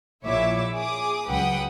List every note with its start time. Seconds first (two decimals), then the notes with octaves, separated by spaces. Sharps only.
0.23 A#1 A#2 E4 C#5 E5 D6
0.74 G#4 D6 D#6
1.28 C#2 F#3 B4 F#5 G5 D#6